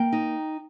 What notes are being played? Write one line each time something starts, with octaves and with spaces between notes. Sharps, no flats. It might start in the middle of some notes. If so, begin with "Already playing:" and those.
Already playing: A#3 G5
D#4